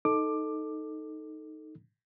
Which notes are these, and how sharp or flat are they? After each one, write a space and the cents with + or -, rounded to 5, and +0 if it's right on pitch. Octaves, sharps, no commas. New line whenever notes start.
D#4 +0 A4 +0 D6 +15